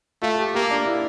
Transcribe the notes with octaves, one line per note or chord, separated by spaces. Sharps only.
A3 F4
G4
A#3 G4
D4
E4